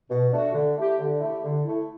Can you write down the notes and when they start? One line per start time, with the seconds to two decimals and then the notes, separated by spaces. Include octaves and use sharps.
0.09 B2
0.32 A3 D4 F#4
0.54 D3
0.76 A3 E4 G4
0.99 D3
1.20 A3 E4 G4
1.43 D3
1.65 A3 E4